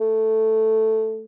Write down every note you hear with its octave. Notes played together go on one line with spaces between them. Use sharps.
A3